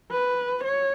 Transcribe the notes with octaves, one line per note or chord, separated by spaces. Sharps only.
B4
C#5